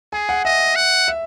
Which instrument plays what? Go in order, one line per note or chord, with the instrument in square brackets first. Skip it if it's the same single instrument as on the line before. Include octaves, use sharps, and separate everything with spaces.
[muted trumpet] G#4 [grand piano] G#5
[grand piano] F#5
[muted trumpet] D#5 [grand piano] E5
[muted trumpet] F#5
[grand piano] E5